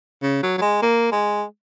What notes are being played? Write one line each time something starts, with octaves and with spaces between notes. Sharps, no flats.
C#3
F#3
F#3
G#3
A#3
G#3